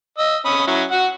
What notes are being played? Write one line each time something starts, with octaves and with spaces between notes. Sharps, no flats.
D#5 E6
C#4 B5 D#6
F#3 C#4 E4
F#4 F#5